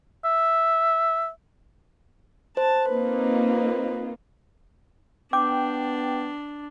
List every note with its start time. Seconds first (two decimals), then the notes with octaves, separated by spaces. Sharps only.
0.24 E5
2.57 C5 A5
2.89 A#3 C4 D#4 F4 B4
5.33 B3 D4 G5 D6